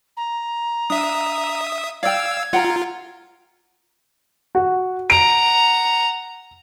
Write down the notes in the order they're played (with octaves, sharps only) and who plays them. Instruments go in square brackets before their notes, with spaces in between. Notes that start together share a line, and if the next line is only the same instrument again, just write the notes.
[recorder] A#5
[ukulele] D4 [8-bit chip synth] E5 D#6
[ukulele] D5 G5 [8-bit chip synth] F5 E6 [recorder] G#6
[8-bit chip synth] F4 [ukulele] F#5 G5 A#5
[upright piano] F#4
[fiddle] F#5 A#5 [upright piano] D7